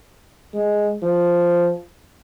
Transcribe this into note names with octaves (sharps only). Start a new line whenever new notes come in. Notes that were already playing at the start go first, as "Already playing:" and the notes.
G#3
F3